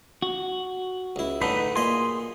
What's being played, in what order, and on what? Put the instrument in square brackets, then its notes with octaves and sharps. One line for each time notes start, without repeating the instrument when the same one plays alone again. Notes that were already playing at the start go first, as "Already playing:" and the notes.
[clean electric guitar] F#4
[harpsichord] C#2 E4
[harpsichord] A2 D3 A3 [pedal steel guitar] D#4 B4
[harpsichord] A#2 D#5 [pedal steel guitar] G#4 C6